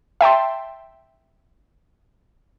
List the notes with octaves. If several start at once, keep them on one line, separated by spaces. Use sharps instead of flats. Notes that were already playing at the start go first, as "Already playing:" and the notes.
E5 G5 A5 C6